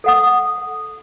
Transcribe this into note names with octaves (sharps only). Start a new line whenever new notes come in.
A4 F#5 D#6